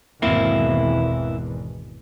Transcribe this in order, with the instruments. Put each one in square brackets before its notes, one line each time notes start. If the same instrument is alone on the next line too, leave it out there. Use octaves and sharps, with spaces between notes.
[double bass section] G#1 E2 B2 [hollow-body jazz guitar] A#3 C4 E4